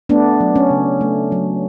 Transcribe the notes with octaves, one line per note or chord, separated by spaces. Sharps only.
A3 B3 D4
F#3
C#4
C#3
A3
F#3